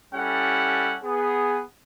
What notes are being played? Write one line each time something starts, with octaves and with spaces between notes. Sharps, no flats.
G3 C#4 E4 G4 A4 F#5
B3 G#4